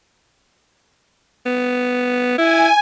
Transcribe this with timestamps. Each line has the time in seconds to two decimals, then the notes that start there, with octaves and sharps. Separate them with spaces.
1.46 B3
2.38 E4 G#5